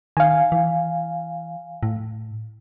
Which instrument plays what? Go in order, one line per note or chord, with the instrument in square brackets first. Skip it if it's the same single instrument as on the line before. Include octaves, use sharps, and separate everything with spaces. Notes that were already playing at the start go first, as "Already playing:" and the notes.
[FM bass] D#3 [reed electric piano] F5 G#5
[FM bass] E3
A2